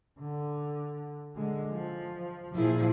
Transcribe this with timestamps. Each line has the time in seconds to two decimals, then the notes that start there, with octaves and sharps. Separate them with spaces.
0.19 D3
1.36 D3 G#3
1.72 F3
2.55 A#2 F3 E4 G#4